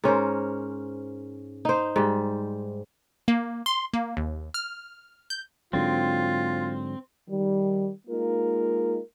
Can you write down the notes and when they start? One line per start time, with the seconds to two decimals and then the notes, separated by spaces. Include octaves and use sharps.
0.04 G#2 C#4 A#4 C5
1.65 D#4 C5
1.96 G#2 G3
3.28 A#3
3.66 C6
3.93 A#3
4.17 D#2
4.54 F6
5.30 G6
5.73 G#2 D3 F#3 C4 F4
7.28 D#3 G3
8.07 G#3 A#3 D#4 F4 A#4